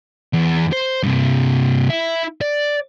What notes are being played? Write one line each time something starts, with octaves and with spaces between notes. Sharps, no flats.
E2
C5
G2 C3
E4
D5